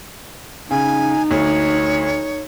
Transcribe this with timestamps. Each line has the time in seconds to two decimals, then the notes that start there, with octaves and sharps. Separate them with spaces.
0.71 C#3 D#4 G#5
1.31 D2 C#5